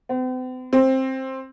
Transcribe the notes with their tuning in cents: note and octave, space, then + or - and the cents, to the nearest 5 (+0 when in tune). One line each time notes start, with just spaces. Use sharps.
C4 -45
C4 +15